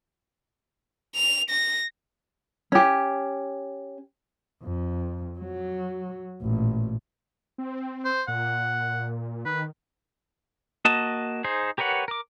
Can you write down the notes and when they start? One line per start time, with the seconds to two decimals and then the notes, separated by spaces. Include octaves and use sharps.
1.15 F7
1.50 A#6
2.72 C#4 G4
4.64 F2
5.39 F#3
6.42 A1 A#2
7.58 C4
8.05 C5
8.28 A#2 F#5
9.45 D#3 B4
10.85 A#3 F#4 D#5 A5
11.44 D#4 G#4 C5
11.78 G4 A#4 B4 C#5 F#5
12.08 A#4 D6